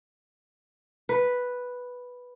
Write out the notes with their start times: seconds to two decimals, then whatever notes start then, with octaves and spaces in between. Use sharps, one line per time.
1.09 B4